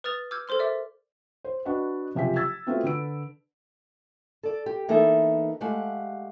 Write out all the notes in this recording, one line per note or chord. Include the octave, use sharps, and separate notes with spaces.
B4 D#6 F6 A6 F7
D6 E6 F6 G6 G#6
A4 A#4 C5 C6 F6
D5 E5 D6
C5
D4 F#4 B4 D#5 F#5
F#1 C3 F3 G4 G#5 B6
E6 G#6 A6 B6
A3 B3 C4 F4 F#4
D3 B4 E6 D7
A4 D5
G4
E3 A#3 B3 D#4 A4 E5
G#3 A3 G4 F5 F#5